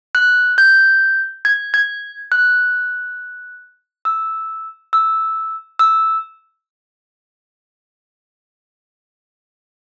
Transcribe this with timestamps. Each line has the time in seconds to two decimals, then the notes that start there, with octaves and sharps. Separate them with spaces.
0.15 F#6
0.58 G6
1.45 G#6
1.74 G#6
2.32 F#6
4.05 E6
4.93 E6
5.79 E6